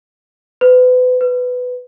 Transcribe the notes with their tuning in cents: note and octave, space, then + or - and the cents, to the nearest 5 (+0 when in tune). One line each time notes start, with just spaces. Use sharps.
B4 +35
B4 +10